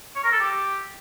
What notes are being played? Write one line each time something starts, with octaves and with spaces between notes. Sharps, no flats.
C#5
A#4
A4
G4